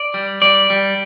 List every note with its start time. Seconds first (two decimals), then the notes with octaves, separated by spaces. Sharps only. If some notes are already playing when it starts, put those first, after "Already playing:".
Already playing: D5
0.14 G3
0.42 G3 D5
0.70 G3